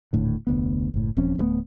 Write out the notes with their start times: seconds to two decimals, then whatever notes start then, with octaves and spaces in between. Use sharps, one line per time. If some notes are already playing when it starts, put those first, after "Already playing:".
0.13 D#1 A2 D3
0.47 F1 D2 B3
0.94 F#1 A2
1.17 D#1 F3 C4 C#4
1.38 D1 G2 A3 B3